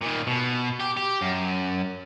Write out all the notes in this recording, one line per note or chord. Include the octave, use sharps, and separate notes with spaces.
A#2 D#3
B2
G4
G4
F#2